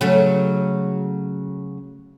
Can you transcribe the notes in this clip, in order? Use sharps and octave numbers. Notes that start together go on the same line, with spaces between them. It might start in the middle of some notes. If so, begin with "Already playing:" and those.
C#3 F#3 A3